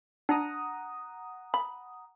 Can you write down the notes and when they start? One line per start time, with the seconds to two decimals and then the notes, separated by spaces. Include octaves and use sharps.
0.29 D4 F#5 A#5 D#6
1.54 B5